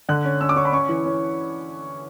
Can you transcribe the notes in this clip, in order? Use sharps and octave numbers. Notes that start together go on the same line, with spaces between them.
D3 F#6
C#4
C#4 E6
D6
C#4 C#6
B5
C#4 C#6
E3
C#4